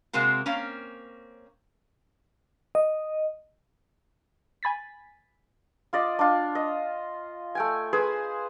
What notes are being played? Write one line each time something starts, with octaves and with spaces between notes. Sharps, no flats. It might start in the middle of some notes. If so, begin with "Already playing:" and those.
C3 G#3 A#3 C4 F#4
A#3 C4 C#4
D#5
G#5 B5 A6 B6
F4 D5 D#5
D4 F4
D#5
A3 G5 G#5
G#4 B4 C5 B5